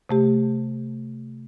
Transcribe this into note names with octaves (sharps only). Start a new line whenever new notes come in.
C3 A3 G4